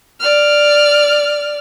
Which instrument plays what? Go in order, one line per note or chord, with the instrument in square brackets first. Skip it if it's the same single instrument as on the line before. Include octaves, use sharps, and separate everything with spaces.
[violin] D5 F6